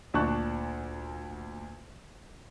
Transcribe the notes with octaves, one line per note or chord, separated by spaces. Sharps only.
D2 A#2 D4 A5 C#6 F#6